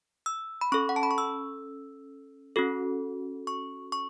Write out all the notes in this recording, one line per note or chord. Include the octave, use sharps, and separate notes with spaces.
E6
B5
C#4 A4 C#6
F#5
A5
B5
C#6
E6
C#4 F#4 A4
C#6
C#6